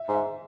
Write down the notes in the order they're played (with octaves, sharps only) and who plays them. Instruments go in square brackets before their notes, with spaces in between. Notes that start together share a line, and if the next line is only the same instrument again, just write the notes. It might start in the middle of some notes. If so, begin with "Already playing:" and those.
Already playing: [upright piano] E5
[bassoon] G#2
[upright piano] E5